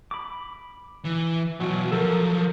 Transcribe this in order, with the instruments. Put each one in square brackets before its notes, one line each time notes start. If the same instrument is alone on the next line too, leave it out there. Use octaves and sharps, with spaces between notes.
[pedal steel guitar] B5 D6
[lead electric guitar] E3
[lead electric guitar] B2 E3 [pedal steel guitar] F#3
[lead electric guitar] F3 F#3 [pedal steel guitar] A4 A#4